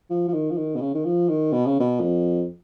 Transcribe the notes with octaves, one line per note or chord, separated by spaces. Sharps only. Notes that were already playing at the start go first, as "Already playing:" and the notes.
F3
F3
D#3
F3
D#3
B2
C#3
D#3
F3
D#3
B2
C#3
B2
F2